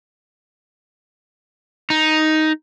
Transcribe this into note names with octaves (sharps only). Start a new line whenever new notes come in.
D#4